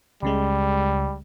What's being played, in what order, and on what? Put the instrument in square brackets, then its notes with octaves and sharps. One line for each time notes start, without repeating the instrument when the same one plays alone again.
[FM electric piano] C#2 C#3 G#3 [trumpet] G3